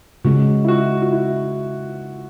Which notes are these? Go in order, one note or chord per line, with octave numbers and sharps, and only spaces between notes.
C#3 G#3 C#4 F#4
E4
F#4
F#4
E4